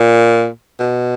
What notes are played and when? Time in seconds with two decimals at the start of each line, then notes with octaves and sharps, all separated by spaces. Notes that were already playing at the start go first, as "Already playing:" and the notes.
Already playing: A#2
0.79 B2